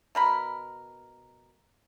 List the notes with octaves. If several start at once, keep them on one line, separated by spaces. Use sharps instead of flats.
B2 A#4 B5